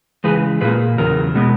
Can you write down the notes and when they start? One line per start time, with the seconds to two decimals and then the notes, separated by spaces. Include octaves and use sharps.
0.24 C#3 E3 G#3 G#4 B4
0.61 A#2 A#3 G#4 B4
0.98 E2 C#3 F#3 A#4
1.35 B2 G#3 B3